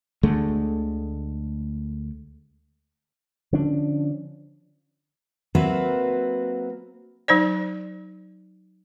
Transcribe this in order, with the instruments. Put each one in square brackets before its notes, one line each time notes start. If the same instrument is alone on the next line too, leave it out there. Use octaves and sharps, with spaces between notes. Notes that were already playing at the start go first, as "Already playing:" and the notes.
[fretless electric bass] D2 D3 G#3 A3
[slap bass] D3 F3 C#4 D4
[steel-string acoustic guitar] F#3 A#3 C4 F#4 B4 E5
[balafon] F#3 D#4 C5 D5